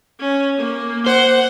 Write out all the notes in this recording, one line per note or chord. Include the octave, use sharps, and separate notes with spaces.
C#4
A#3
C5 F#5